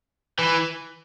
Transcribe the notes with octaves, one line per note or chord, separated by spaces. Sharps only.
E3